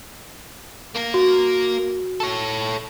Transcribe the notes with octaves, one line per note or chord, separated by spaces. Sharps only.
A#3 A#4
F#4
A4 C#5